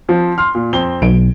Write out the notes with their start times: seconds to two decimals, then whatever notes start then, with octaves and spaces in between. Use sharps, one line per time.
0.09 F3 C4
0.38 C6 F6
0.55 A#2
0.73 F2 C4 G7
1.02 B1 D7